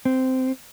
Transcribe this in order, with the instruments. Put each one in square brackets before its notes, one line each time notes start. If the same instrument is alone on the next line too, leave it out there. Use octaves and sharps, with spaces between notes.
[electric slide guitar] C4